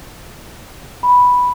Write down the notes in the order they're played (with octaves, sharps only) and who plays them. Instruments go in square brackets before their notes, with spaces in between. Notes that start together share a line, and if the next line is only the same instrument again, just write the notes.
[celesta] B5